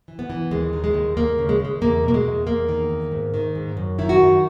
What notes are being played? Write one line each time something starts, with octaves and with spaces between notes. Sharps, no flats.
E3
B3
E3
D#2 G#3
D#3
G#3
D#2
D#2 A#3
C#3
G#3
D#2 G#3
E2 A#3
B2 A#3
G#3
E2
E2 A#3
D#3
E2
G#2
D#3
G#2
F#2
D#3 E4
F#4
F#2